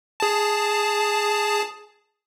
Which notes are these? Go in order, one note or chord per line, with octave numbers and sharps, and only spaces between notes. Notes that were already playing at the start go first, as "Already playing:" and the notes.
G#4 A5